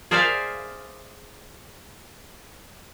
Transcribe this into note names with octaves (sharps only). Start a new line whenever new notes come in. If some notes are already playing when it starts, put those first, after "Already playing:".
G#4 A#4 C5 D5 E5 F5